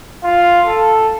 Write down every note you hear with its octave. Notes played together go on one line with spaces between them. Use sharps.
F4
A4